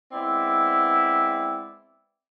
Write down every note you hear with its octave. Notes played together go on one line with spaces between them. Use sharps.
G#3 B3 C4 E4 D5